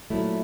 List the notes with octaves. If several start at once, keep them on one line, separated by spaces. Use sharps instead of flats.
A#2 F#3 A3 E4